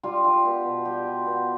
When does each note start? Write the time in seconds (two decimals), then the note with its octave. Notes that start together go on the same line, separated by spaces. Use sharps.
0.03 G3 F4
0.24 F4
0.45 B3 G4
0.64 B2
0.85 G3 G4
1.05 F4
1.26 B3